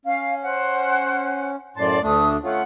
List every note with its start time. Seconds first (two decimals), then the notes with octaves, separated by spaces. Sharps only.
0.05 C#4 F5
0.43 C5 F#5
1.76 F#2 A2 D5 A5 C6
2.02 D2 A3 D4 D#6
2.44 A3 C#4 F4 F#5